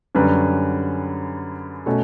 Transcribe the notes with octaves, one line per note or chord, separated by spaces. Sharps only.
F#2 D3 G3 C#4 B4
B2 A3 C#4 A4